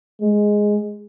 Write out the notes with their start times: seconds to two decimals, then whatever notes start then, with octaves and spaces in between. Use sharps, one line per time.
0.22 G#3